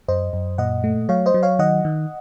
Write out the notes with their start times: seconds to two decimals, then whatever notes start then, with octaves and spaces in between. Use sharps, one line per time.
0.08 F#2 C5 D#5
0.33 F#2
0.58 A#2 D#5 F#5
0.84 A3
1.09 F#3 C#5 F5
1.26 C5 D#5
1.34 F#3
1.43 C#5 F5
1.59 D#3 D#5 F#5
1.85 D#3